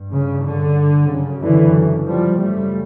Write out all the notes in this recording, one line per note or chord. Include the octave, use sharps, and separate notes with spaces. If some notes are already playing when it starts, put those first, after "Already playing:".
Already playing: G2
C#3
D3
F#2 C#3
D3 E3
F3 G3
F#2 C#3 G3 A3